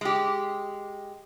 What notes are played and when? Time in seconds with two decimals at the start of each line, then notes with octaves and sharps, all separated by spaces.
0.01 G#3 G4